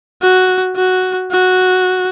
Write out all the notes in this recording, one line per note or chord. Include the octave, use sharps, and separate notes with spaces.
F#4
F#4
F#4